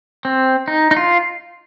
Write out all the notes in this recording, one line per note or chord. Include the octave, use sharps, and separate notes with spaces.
C4
D#4
D#4
F4